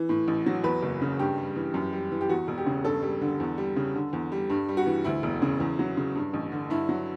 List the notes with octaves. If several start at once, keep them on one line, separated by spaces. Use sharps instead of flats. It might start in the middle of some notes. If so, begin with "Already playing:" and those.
Already playing: E3
A2
A1
F#3
E2 B4
F#1
C#3
G2 G4
G3
E3
F#2
G3
E3
G4
E2 F#4
E1
G4
C#3
G2 A4
G3
D3
E2
G3
C#3
D3
E2
G3
G2
G3
F#4
E3
D2 E4
E1
C#3
E2
F#3
C#3
G2
A1
D3
G2 E4
F#3